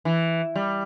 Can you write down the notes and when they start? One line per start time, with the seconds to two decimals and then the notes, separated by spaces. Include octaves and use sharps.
0.05 E3
0.56 G3